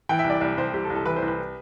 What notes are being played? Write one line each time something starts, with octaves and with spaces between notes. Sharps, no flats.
E3 G5
E5
C2
D5
C2 D5
C2 C5
C2 G4
A4
C2
A4
E3 B4
C5
C2
B4